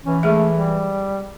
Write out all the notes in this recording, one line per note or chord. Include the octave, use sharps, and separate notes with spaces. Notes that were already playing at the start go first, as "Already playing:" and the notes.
E3 C#4
G#3 A3 G#4 E5
G3